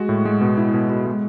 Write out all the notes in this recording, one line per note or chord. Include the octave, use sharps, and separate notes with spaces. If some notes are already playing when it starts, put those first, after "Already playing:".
Already playing: G#3 F#4
A2
G#3
B2
E4
B2
B2
G#3